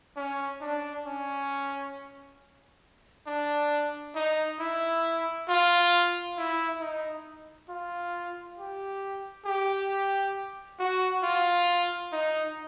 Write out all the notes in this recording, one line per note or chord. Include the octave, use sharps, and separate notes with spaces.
C#4
D4
C#4
D4
D#4
E4
F4
E4
D#4
F4
G4
G4
F#4
F4
D#4